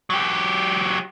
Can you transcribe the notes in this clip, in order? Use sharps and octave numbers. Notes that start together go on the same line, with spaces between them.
F#3 G4